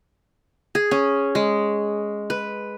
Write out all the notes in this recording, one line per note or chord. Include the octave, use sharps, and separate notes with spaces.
G#4
C#4
G#3
B4